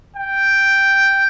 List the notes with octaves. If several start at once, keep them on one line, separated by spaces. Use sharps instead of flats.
G5